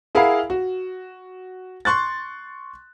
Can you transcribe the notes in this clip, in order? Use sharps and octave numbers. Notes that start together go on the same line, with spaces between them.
E4 G#4 A#4 F5 F#5 B5
F#4
C6 C#6 F#6 A6